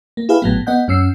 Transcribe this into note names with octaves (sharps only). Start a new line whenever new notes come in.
A#3
E4 G4 G#4 B4 F5
G#1 A2 F#3 B3
B3 D#5 F#5 G6
F#2 C#4 E6 C7